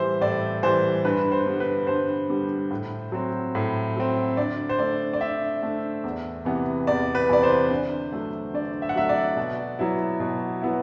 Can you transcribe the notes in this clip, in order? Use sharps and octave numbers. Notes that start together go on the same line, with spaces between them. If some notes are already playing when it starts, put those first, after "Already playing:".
Already playing: A2 E3 G3 C5 E5
A2 D5
E3 G3 C5
G2 B4
C5
D3 G3 B3
B4
G2 C5
D3 G3 B3
A2
F#3 C4
A2
F#3 C4
D3 D5
C5
A3 D4 D5
D5
D3 E5
A3 D4
E2
C3 E3 B3
E2 D5
B4
C3 E3 B3 D5
C5
D3
F#3 A3
D3 D5
E5
F#5
F#3 A3 E5
D5
B2
F#3 B3 E4
B2
F#3 B3 E4